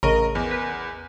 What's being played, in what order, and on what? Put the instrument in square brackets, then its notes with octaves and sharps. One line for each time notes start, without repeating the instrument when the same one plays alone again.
[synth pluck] A1 C#3 D#5 [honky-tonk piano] A#4
[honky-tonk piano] E2
[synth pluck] B4